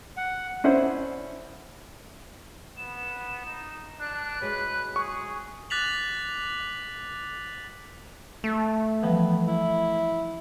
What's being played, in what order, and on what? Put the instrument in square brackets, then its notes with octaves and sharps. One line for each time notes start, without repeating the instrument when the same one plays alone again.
[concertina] F#5
[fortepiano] C#4 D4 E4 C5 F#5
[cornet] B3 [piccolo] E7
[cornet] D#4
[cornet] D4 [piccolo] F#6
[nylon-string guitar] F#3 G#3 [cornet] B4
[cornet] G#4 [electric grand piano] C#6
[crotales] D6 F#6 A6 B6 F7 F#7
[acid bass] A3
[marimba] E3 F3 G3 [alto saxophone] B3
[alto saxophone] E4